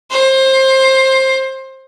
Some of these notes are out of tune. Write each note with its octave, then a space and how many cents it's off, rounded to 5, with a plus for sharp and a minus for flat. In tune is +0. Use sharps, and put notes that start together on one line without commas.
C5 +20